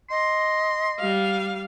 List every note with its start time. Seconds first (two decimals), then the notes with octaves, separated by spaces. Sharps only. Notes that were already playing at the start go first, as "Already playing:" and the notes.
0.10 D#5 C6
0.99 G3 F5